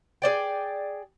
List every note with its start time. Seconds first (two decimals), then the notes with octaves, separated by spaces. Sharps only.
0.22 G#4 C5 D5 G5